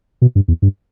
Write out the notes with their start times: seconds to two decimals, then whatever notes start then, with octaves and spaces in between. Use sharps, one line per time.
0.22 B2
0.35 G2
0.48 E2
0.62 G2